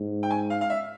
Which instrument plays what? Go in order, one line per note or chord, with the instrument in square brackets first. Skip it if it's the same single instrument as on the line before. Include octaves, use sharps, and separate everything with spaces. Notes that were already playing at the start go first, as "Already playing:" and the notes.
Already playing: [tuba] G#2
[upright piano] G5
G#5
F5
F5
E5